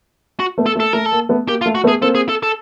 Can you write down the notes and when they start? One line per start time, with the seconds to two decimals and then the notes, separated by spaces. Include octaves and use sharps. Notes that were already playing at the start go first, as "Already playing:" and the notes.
0.40 F#4
0.58 A3 B3
0.66 A4
0.75 A3
0.80 A4
0.93 A3 A#4
1.06 A4
1.12 A#3
1.29 A3 B3
1.48 A#3 G4
1.61 F4
1.66 A3
1.75 F#4
1.84 A3 B3
1.88 G#4
2.01 A#3 C4 A4
2.15 G#4
2.29 A4
2.43 A4